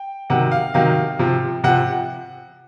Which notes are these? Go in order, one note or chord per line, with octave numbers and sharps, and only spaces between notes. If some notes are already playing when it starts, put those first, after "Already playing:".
Already playing: G5
C3 D#3 F#3 F#5
F5
C3 D#3 F#3 F5
C3 F3
C3 F3 F#5